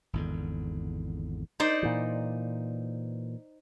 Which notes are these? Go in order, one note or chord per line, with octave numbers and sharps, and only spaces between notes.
G#1 E2 D3
D#4 C5 D5
A#2 E3